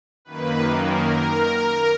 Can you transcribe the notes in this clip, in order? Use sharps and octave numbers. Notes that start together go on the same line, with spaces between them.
F#2 D#3 A#3 B4
A#4